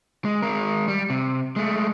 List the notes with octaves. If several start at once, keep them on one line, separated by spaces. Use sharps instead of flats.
G#3
G#3 A#4
G3
C3
G#3 A3